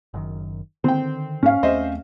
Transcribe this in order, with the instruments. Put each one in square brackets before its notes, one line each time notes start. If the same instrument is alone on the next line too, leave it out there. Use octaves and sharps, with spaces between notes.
[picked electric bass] F#1 F#2 D#3
[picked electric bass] D3 D#3 [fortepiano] C4 G5
[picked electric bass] G#2 [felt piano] C#4 F5
[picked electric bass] D#2 A3 C4 [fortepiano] C5 D#5 E5